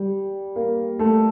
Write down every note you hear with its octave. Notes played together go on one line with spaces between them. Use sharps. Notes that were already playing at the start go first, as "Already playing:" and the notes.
Already playing: G3
A#3
A3